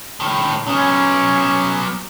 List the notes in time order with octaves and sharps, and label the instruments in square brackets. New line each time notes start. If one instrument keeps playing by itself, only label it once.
[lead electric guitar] A2 D#3
[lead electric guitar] F#3 B3 [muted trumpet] C#4